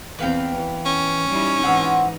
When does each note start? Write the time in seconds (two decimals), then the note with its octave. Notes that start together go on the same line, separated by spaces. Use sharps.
0.19 E2 C4 B4 F5 G5
0.55 E3
0.85 C#4
1.28 G3 D#4 E4
1.63 G#2 E3 C4 D#4 F#4 F#5